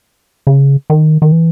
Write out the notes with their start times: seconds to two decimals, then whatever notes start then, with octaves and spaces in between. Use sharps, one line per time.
0.47 C#3
0.90 D#3
1.22 D#3
1.32 E3